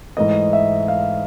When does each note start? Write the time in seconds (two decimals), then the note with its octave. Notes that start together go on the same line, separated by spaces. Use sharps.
0.17 G#2 E3 A3 D#5
0.53 E5
0.88 F5